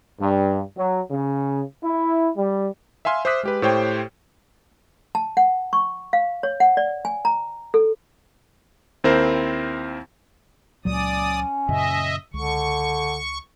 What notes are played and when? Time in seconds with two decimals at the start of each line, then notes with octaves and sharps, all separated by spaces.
0.20 G2
0.77 F#3
1.11 C#3
1.83 E4
2.37 G3
3.05 E5 F5 G#5 C6 F6
3.25 C5 E5 D6 D#6 F#6 B6
3.43 G#3 G4 B4
3.62 A2 G4 C5 C#5 G5
5.15 A5
5.37 F#5
5.73 C#6
6.13 F5
6.43 C#5
6.60 F#5
6.77 D5
7.05 G#5
7.25 A#5
7.74 A4
9.04 D#2 C4 E4 A#4 C5
10.85 C#2 A#2 F#3 C#4 D5 D#6
11.69 F#2 A#2 C#3 D#5 E5
12.34 C#2 D3 C#6